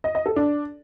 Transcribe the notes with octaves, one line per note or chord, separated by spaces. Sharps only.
D#5
D#5
A4
D4